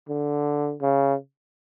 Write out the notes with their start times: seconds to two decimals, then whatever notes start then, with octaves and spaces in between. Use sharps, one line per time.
0.09 D3
0.82 C#3